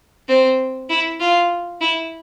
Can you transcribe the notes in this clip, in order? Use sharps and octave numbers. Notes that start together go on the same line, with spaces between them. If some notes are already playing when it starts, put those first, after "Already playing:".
C4
E4
F4
E4